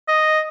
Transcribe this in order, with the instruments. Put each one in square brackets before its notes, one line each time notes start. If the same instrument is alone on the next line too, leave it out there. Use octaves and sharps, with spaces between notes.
[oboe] D#5